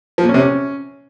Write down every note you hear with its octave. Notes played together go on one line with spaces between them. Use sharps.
F3
A#2
C#4
C3
C#4